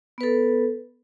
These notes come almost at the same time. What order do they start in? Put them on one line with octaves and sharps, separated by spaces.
B3 B4 A4